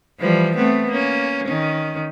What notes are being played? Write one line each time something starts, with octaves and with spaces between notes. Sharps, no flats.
E3 F3 G3
A3 B3 C4
A#3 C#4
D#3 C#4